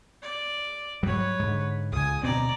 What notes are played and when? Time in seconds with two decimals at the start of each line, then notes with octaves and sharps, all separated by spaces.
0.22 D5
1.03 G#2 F#3 G3 B4 C#5
1.39 G#2 D3
1.92 C#2 G#5 D#6
2.23 D2 B2 C4 D5 A#5